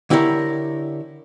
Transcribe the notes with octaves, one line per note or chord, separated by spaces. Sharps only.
D3 E4 G4 A#4 C#5